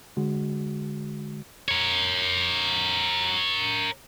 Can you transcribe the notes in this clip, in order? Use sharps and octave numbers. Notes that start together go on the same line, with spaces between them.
D3 G#3 F#4
A#4 C#5